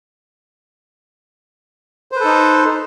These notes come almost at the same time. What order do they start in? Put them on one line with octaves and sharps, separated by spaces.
C5 B4 A4 D#4